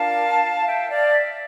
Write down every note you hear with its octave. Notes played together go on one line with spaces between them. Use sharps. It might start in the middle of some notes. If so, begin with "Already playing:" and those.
Already playing: D4 F4 A#4 F5 A5
E5 G5
D5 F5
E5